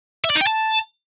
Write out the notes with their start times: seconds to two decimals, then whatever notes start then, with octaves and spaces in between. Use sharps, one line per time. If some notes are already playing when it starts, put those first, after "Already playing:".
0.25 E5
0.30 D5
0.35 D#4
0.41 G5
0.46 A5